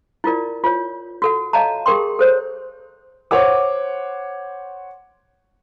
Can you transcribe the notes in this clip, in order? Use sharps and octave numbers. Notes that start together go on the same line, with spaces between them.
E4 F4 A#4 D5
F4 C#5
F#4 A4 F#5
C#5 D#5 F5 A5 A#5
G4 G#4 A#4 G5 C6
A4 C5 C#5
C5 C#5 F#5 D6